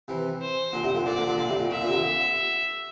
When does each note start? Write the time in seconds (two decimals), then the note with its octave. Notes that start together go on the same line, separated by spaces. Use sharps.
0.08 C3 E3
0.41 C5
0.73 A#2 D3
0.84 A2 C3
0.94 A#2 D3
1.06 A#2 D3 D5
1.17 A#2 D3
1.27 A#2 D3
1.38 A#2 D3
1.49 A2 C3
1.60 A#2
1.71 A#2 E5
1.81 A#2 D3
1.88 C3
1.92 A#2 D3